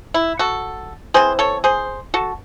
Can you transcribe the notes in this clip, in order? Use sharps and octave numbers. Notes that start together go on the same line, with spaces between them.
E4
F#4 A4
E3 C4 G#4 C5
A4 C#5
G#4 C5
F#4 A4